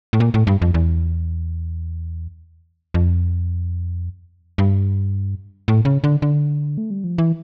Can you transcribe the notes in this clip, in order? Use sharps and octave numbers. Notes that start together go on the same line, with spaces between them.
A2
A#2
A2
G2
F2
E2
F2
G2
A2
C#3
D3
D3
A3
G3
F3
E3